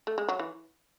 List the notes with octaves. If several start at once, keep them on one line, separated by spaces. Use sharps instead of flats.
A3
G#3
F#3
E3